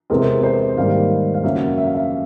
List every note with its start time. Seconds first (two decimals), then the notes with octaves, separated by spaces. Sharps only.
0.10 E2 C3 E3 G#3 C4 A#4
0.43 C5
0.76 G#2 D#3 G3 A#3 F5
1.34 F5
1.44 F#2 C#3 F#3 A#3 C#4 E5
1.78 E5
1.86 F5
1.95 E5